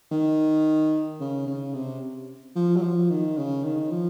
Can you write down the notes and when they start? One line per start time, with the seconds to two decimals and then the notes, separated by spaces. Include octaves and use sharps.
0.12 D#3
1.20 C#3
1.47 C#3
1.74 C3
2.56 F3
2.76 F#3
2.83 F3
3.10 D#3
3.37 C#3
3.64 D#3
3.91 F3